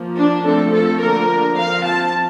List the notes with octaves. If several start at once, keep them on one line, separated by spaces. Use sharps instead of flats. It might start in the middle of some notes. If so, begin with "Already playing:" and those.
Already playing: F3 A#3
D4
F3 A3 C4 A4
A4
D3 F3 A#3 D4 A#4
F3 C4 F5
A5